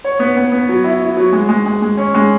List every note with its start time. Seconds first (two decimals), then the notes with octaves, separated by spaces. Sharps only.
0.04 C#5
0.19 B3
0.37 B3
0.52 B3
0.69 F#3
0.84 E4
1.01 E4
1.17 F#3
1.33 G#3
1.49 G#3
1.66 G#3
1.82 G#3
1.97 C#4
2.14 G#3